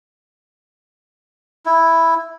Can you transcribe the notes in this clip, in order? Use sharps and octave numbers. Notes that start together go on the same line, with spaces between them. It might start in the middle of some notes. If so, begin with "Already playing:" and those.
E4